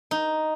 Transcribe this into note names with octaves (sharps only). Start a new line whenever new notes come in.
D#4